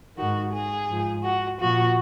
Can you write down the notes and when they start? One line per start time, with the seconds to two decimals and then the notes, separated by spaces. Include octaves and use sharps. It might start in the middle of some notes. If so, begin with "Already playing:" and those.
0.17 G#2 D#3 F#4
0.52 G#4
0.88 G#2 F3
1.23 F#4
1.58 A#2 F3 F#4